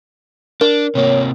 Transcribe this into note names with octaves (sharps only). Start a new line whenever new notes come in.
D4 A#4
C3 A#3 C#5